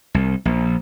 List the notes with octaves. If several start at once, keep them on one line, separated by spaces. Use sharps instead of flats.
C2
A#1